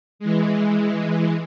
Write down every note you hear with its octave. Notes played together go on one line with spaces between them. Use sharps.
E3 G#3